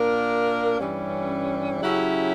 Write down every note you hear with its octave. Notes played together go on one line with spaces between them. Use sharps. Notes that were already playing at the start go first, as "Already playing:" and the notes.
Already playing: A#2 A#3 D4 A#4
G2 E3 G3 C#4
C#3 F#3 C#4 E4 G4